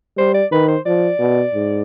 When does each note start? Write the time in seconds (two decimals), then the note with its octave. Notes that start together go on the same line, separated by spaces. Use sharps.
0.18 G3 C5
0.34 D5
0.52 D#3 B4
0.68 C5
0.86 F3 D5
1.19 B2
1.54 G#2